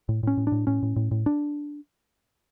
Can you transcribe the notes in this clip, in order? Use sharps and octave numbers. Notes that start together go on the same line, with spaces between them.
A2
A2 C#4
A2
D4
A2
A2 C#4
A2
A2
A2
D4